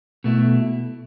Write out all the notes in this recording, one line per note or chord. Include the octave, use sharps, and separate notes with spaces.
B2 A3 E4